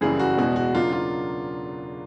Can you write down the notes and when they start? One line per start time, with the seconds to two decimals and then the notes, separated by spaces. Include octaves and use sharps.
0.01 F#2 C#3 E3 G3 A#3 G#4
0.19 F#4
0.37 E2 B2 G#3 B3 F#4
0.56 F#4
0.74 C#3 F#3 A#3 D4 F4
0.92 F4